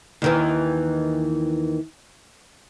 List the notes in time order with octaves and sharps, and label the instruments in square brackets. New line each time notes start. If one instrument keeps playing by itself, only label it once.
[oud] D#2 D#3 E3